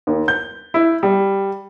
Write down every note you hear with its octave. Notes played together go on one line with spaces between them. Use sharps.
D#2
G6
E4
G3